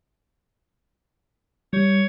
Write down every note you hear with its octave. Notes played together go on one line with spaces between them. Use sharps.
G3 C#5